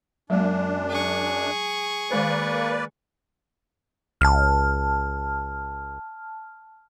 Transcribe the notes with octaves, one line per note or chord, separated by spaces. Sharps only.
F#2 F#3 G#3 A#3 D4
G#4 C#6
D#3 G#3 A#3 B4 C5 D5
C#2 A5 F6